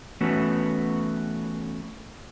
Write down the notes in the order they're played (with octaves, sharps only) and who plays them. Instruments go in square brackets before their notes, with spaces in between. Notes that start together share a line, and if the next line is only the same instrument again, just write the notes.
[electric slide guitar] E3 A3 B3 C#4 F#4